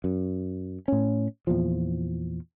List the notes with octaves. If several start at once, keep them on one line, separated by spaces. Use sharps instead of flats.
F#2
A2 C#4
E2 A#2 F3